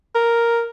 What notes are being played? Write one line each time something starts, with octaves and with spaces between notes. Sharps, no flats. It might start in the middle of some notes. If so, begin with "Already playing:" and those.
A#4